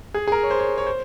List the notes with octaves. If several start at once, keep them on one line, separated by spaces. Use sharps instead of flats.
G#4
G#4
A#4
C#5
C5
C#5
C#5
C5